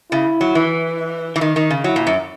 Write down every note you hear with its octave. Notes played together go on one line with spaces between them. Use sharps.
C#3 E4
F#3
E3
E3
D#3
D#3
C#3
F#3 E4
A#2
F#2